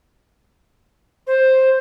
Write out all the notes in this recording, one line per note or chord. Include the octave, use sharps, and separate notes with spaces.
C5